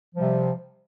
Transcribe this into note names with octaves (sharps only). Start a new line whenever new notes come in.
C3 F3 G3